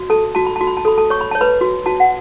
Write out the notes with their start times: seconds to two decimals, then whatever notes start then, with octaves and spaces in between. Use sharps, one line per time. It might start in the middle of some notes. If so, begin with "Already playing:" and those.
Already playing: F#4
0.10 A4 A5
0.35 F#4 A5
0.46 B5
0.56 F#4 A5
0.67 B5
0.77 A5
0.85 A4 B5
0.98 A4 A5
1.10 C#5 C#6
1.21 B5
1.31 C#5 A5
1.41 B4 B5
1.61 F#4
1.86 F#4 A5
2.00 F#5